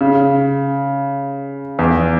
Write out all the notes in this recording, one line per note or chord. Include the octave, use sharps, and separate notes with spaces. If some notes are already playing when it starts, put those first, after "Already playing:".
C#3
E2